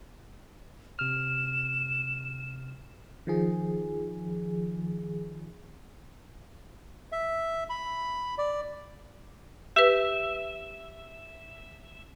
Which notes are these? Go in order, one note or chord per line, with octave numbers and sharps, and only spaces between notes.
C3 F6 E7
D#3 F3 G#4
E5
B5
D5
G4 B4 E5